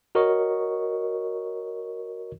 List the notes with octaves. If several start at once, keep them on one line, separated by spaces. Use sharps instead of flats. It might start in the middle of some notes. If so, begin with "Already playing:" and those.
F#4 A#4 C#5 D#5 C#6